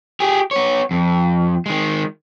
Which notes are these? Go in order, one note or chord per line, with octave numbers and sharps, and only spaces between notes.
G4 G#4
B3 C#5
F2
D#3 G#3